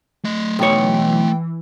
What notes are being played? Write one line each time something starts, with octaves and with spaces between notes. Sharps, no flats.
A3 D#5
B1 E3 C#5 G5